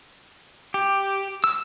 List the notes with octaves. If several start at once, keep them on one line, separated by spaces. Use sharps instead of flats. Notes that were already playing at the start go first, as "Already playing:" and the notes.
G4
E6